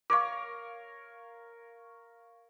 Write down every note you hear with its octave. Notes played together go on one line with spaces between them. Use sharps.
A#4 C#5 F5 C#6 D6